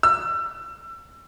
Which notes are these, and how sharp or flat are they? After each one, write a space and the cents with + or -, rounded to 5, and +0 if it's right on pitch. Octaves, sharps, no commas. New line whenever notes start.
E6 +30